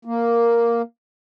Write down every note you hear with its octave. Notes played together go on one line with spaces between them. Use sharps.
A#3